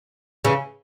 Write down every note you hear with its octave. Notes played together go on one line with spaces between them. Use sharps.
C#3 E3